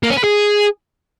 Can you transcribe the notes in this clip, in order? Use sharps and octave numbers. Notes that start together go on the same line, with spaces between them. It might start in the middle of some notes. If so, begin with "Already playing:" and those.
A#3
C#4
B4
G#4